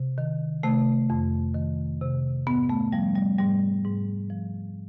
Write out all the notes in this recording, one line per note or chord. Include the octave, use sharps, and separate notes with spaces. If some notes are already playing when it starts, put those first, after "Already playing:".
Already playing: C3
D#3
C3 A3
F2
D#3
C3
G#2 B3
A3
F3 G3
G3
G#2 G3
G#2
F3